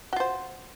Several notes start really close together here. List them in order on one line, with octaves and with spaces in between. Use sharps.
F#4 F4 C5